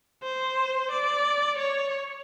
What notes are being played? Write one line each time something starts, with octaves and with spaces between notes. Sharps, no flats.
C5
D5
C#5